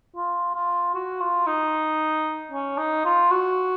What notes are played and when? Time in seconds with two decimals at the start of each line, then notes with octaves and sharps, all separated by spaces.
0.16 F4
0.55 F4
0.94 F#4
1.21 F4
1.47 D#4
2.52 C#4
2.78 D#4
3.05 F4
3.31 F#4